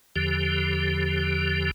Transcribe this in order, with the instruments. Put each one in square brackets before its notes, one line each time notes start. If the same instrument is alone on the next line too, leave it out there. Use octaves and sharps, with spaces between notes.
[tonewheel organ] E2 D3 F3 G4